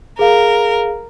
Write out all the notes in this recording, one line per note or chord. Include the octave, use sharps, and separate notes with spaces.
G#4 A#4 F5